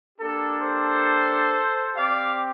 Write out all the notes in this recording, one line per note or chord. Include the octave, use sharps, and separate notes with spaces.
A#3 D4 G4 A4
A4 C5
C4 G4 D5 F5